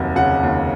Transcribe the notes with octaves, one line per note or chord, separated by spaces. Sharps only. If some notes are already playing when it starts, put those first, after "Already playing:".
Already playing: F1 D#2 F#3 F#5
C#3 F#5
D#2